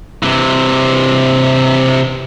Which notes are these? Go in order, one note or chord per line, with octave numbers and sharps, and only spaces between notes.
C3 E3